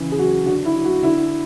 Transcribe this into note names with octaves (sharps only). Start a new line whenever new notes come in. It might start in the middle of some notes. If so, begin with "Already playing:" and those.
Already playing: C#3 E3
G#4
F#3 F#4
D3 F#4
E4
F#3
F#4
D3 E4